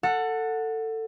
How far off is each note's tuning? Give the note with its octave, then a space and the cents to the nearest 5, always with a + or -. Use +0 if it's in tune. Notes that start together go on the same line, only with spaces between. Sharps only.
A4 +20 F#5 -10